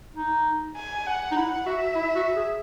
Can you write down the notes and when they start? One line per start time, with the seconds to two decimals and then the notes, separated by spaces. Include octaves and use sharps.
0.16 D#4
0.77 G#5
1.06 F#5
1.31 D#4
1.36 E4 F#5
1.66 F#4 E5
1.95 E4
2.16 F#4
2.36 G#4